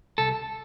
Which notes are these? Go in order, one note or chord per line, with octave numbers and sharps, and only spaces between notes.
C2 A4